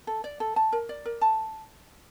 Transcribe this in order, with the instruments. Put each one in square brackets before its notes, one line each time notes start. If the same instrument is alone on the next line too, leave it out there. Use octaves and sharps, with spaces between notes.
[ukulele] A4
D5
A4
A5
A#4
D5
A#4
A5